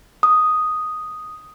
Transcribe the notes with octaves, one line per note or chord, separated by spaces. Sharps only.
D#6